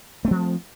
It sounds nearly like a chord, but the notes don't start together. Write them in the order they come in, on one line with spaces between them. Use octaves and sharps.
A3 C4 F3